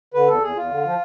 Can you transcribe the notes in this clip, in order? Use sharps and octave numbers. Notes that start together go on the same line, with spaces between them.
D3 B4
E2 A4
E2 G#4
E2 F4
D3
F3